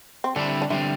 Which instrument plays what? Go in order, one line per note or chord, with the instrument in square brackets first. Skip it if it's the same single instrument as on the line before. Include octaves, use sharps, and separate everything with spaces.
[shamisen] C4
[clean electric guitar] D3 G3 C4 E4 [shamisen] D4
[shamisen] D4
[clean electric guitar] D3 G3 C4 [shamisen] E4